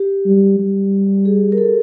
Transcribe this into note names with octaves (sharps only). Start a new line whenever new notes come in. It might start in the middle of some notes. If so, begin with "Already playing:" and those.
Already playing: G4
G3
G3
G#4
A#4
A4